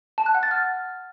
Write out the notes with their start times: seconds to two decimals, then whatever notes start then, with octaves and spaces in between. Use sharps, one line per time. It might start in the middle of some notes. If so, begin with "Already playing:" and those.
0.18 A5
0.26 F#6
0.35 F#5
0.43 A6
0.51 F6